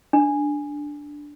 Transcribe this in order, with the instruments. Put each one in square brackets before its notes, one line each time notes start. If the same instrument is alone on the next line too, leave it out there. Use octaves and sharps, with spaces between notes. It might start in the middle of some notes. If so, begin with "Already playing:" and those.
[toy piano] D4